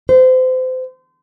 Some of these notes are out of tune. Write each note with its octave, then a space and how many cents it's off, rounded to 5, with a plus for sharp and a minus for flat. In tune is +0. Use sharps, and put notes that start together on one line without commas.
C5 -30